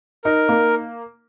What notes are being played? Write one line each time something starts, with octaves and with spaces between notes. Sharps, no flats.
D#4 A#4
A#3